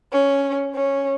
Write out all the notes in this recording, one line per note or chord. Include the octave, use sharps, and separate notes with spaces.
C#4
C#4